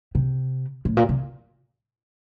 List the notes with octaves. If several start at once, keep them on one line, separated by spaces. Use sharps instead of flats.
C3
A2
A#2
C3